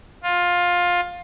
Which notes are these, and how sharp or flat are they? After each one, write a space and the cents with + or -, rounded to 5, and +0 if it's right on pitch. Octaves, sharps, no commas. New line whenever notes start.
F4 +15